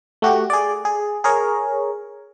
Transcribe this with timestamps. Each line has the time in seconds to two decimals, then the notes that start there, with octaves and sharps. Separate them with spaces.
0.22 A3 F#4 G4
0.50 G#4 D5
0.85 G#4
1.24 G#4 A#4 C#5